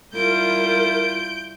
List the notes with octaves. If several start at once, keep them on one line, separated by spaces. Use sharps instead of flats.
G3 E4 F4 A#4 G6 D7